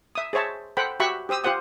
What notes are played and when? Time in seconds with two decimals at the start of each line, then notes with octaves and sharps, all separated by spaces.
0.15 E5 D#6
0.33 G#4 C5 C#5 E5 A5
0.77 A4 C5 F#5 G5 B5
1.00 F#4 G4 E5 F#5 B5 C#6
1.29 G4 C5 D#6 E6
1.44 F4 G4 C5 F#5 D#6